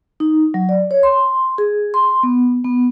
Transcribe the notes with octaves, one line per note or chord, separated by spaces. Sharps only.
D#4
F#3
D5
C#5
C6
G#4
C6
B3
B3